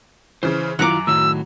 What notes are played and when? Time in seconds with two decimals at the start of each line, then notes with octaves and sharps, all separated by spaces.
0.43 C#3 E3 C5
0.79 F#2 D#3 E4 F4 F#5 A#5 D6 F7
1.07 A2 D#3 F#3 E6